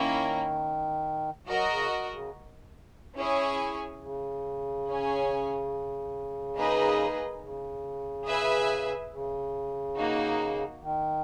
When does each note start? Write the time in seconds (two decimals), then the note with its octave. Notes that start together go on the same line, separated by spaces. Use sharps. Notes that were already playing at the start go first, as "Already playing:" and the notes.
Already playing: D#3 A#3 C#4 E4 A#4
1.47 F#3 F#4 A#4 D#5
1.69 C#3
2.11 C#3
3.16 C#4 E4 G#4 C#5 G#5
4.01 C#3
4.87 C#4 G#4 C#5 G#5
6.57 A#3 D#4 G#4 B4 D#5
7.42 C#3
8.26 G#4 B4 E5 G#5
9.11 C#3
9.96 A#3 D#4 F#4
10.81 D#3